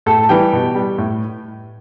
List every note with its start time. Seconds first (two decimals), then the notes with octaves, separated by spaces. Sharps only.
0.06 A2 A4 A5
0.23 A5
0.29 E3 G3 G4 G5
0.53 B2
0.75 G3
0.98 A2